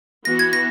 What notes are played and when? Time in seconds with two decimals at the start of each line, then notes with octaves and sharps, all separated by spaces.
0.25 E3 B3 F#4 A#6
0.39 G#6
0.53 A#6